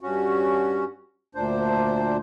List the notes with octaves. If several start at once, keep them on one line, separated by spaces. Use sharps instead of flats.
G2 C#4 F#4
D2 A#2 D4 C5